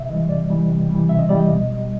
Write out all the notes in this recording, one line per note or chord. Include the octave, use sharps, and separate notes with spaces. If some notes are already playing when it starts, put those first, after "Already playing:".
Already playing: C3 E5
E3 G3 D#5
C3 D5
E3 G3
C3
E3 G3
C3 E5
D#5
E3 G3 D5
D#5
B2
G3